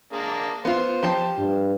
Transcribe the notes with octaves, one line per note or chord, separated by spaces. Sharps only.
G#3 A#3 D4
B3 F4 C5
F3 G4 A5
G2